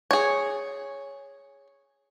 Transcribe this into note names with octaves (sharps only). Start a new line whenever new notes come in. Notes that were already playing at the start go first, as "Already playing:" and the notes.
G#4 C#5